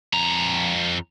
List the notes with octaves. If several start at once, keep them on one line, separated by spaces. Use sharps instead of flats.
F2 A#5